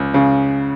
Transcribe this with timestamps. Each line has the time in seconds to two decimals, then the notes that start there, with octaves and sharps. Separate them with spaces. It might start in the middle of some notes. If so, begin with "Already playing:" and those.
Already playing: C#2
0.14 C#3